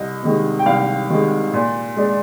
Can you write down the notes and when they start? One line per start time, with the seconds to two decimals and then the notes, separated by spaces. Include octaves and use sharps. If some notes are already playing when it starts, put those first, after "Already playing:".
Already playing: C2 D#5
0.23 C3 D#3 G#3
0.59 G5
0.66 C2 F5
1.10 C3 D#3 G#3
1.54 A#2
1.97 G#3 D4